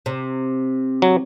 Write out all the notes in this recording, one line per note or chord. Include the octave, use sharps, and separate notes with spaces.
C3
F#3